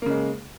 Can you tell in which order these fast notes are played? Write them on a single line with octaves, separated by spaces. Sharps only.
A#3 C#3 G#3